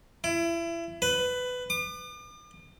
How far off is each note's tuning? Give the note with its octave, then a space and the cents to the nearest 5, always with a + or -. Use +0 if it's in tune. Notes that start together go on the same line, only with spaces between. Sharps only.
E4 +30
B4 +15
D6 +45